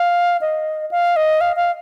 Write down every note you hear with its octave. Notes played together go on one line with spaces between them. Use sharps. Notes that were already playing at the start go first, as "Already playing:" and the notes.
Already playing: F5
D#5
F5
D#5
F5
F5